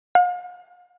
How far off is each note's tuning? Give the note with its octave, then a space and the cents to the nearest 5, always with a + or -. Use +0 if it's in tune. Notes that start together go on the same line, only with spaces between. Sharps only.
F5 +45